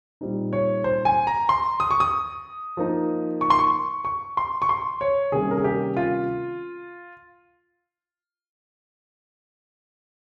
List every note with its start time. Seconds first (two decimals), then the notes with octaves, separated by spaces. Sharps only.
0.21 A#2 G3 C4 D#4
0.53 C#5
0.84 C5
1.05 G#5
1.27 A#5
1.49 C6
1.80 D#6
1.91 C#6
2.00 D#6
2.77 F3 A#3 D#4
3.41 C#6
3.50 C6
3.59 C#6
4.05 C#6
4.37 C6
4.62 C#6
4.69 C6
5.01 C#5
5.32 C3 D#3 G3 A#3 C#4 G#4
5.51 A#4
5.58 G#4
5.64 G4
5.97 F4